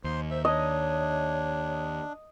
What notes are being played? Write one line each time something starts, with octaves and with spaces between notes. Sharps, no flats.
D#2 C5 C6
C5 E5
D4 C#5 D#5